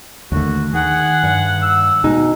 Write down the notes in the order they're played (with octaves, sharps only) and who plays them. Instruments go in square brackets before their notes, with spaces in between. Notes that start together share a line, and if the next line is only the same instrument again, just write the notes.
[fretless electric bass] D#2 D3 A3 [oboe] F#4
[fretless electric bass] D#3 [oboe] G#4 [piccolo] F#5
[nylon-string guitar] G2
[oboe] E6
[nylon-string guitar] B2 G#3 D#4